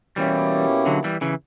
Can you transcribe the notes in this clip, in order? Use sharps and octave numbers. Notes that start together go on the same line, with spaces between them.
B2 E3 G3 A#3 C#4 E4 G4
D3 F#3
E3 G3
C#3 E3